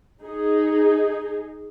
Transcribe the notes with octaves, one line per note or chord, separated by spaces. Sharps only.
D#4 G#4